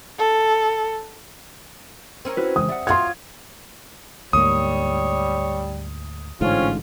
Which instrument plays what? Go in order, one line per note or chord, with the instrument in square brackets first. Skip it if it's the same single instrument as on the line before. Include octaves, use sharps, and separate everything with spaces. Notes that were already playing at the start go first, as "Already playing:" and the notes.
[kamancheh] A4
[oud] C4 C#4 A#4
[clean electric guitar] E4 F#4 B4
[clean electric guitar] C#2 E3 G#3 [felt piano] D#6
[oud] G3 [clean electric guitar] E5 F#5
[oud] F4 F#4 C#5 [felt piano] C6 G#6
[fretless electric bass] D2 G#2 A#3 [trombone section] G3 [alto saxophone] C#5 [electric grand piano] D#6
[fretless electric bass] A1 G#2 D3 [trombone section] C4 C#4 [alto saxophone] F4